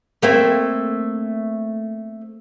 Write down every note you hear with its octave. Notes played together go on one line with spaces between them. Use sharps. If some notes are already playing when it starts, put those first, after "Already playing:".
A3 A#3 C4